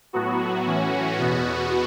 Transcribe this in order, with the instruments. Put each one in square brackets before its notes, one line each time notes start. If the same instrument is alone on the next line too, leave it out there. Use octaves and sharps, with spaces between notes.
[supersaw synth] A2 F#3 B3 F#4
A2 E3 C#4
E2 B2 B3 F#4